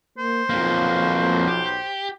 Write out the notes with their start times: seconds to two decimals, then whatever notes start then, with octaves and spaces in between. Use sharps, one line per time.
0.18 A#3 C5
0.50 B1 F2 F3 A#3
1.47 G4